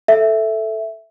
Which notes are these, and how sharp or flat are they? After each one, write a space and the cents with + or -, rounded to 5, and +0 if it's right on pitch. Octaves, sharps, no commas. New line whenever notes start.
A4 +0 E5 +0